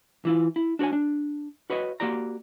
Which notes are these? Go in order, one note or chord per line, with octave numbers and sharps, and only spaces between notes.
E3 E4 F4
E4
D4 F#4 A#4 C#5 G#5
D4
F#4 B4 C#5 D#5 E5
A#3 F#4 G4 D5 A#5